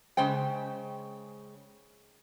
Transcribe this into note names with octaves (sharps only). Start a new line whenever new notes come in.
C#3 G#3 C5 G5